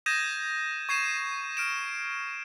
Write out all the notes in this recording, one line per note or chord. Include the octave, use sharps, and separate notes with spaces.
D#6 G6 G#6 A#6 D#7 E7
C#6 G#6 C7 D#7 E7
F6 D7 E7